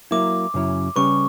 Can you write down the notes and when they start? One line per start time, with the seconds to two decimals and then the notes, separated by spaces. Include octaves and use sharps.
0.11 F#3 A#3 E4 D6
0.54 F#2 C#3 F#3 C#4 E4
0.96 C#3 G3 C#4 G4 B4 C#6